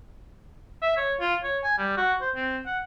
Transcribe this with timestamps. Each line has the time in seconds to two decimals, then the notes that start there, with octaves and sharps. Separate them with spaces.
0.82 E5
0.97 C#5
1.20 F4
1.43 C#5
1.64 G#5
1.78 G3
1.97 F#4
2.21 C5
2.36 C4
2.66 F#5